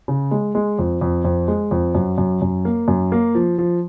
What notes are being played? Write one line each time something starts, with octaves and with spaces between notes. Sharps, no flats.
C#3
G#3
G#3
F2
F2
F2
G#3
F2
F#2
F#2
F#2
A#3
F#2
A#3
F3
F3